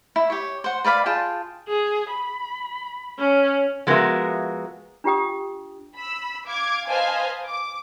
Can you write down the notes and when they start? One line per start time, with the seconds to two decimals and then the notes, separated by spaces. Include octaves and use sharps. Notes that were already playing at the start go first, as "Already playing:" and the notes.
0.16 E4
0.30 G4 C#5
0.64 C5 F#5
0.85 B4 D5 F5 B5
1.06 F4 G#4 G5 A5
1.68 G#4
2.10 B5
3.19 C#4
3.87 F3 G#3 B3 F#4 A#4 E5
5.04 D4 F4 G4 G5 D#6
5.96 B5 E6
6.47 F5 D6 G#6
6.87 B4 C5 D#5 F5 G#5 A5
7.47 D6